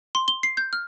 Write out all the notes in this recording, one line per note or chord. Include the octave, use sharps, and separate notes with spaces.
C6
G7
C7
G6
F6